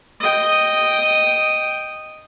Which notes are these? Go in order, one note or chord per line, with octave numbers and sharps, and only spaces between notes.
D#5 G5